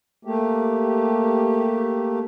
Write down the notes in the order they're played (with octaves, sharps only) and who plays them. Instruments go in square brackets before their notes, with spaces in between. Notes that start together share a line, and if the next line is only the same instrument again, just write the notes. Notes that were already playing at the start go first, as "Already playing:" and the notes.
[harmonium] A3 A#3 G4